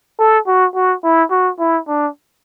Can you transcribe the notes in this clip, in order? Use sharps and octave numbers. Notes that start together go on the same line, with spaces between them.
A4
F#4
F#4
E4
F#4
E4
D4